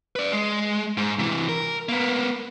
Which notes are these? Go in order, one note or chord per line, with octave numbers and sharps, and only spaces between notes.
B4 D5
G#3
G#2
C3 E3
A#4
A#3 B3